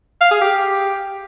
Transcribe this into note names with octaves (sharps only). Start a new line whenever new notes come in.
F5
G#4
G4